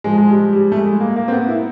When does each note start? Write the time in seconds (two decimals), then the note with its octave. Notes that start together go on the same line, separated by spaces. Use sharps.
0.04 G#2 F3 G#3
0.18 G#3
0.29 G3
0.53 G3
0.72 A3
0.77 G#3
1.00 A#3
1.16 A#3
1.28 C4
1.33 B3
1.48 E4